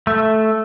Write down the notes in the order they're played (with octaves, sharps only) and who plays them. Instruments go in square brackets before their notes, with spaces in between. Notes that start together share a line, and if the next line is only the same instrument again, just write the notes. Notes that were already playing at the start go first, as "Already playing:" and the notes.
[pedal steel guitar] A3